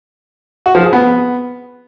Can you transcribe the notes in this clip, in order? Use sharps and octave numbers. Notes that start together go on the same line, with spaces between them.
F#4
F3
G#4
B3